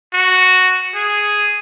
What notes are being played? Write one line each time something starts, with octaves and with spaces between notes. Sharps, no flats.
F#4
G#4